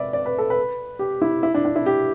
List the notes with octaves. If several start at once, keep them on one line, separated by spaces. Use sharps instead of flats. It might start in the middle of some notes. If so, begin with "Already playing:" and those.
Already playing: B4 D5 E5
D5
B4
A4
B4
G4
E4
E4
D4
D4
E4
G4